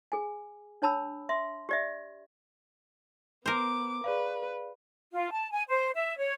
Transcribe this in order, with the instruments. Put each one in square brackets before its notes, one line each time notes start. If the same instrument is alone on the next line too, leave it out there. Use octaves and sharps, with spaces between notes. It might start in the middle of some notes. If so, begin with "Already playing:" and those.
[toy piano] G#4 G#5
D4 C#5 A5 B5 E6
E5 C6
G4 D5 E5
[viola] B3 D6 [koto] A#4 C5
[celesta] G#4 D5 F5 [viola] B4
[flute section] F4
A5
G#5
C5
E5
C#5